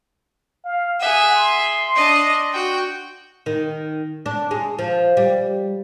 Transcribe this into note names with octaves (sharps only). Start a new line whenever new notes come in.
F5
G#4 E5 F#5
C6
D4 D#5
F#4 G5
D#3
D4
G#3
F3
G3